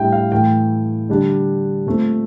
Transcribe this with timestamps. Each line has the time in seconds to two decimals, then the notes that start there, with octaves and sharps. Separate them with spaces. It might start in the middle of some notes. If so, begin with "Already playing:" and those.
Already playing: A2 G3 D4 E5 G5
0.12 F5
0.32 A2 E3 A3 G5
1.09 D3 G3 D4
1.87 A#2 A3 C4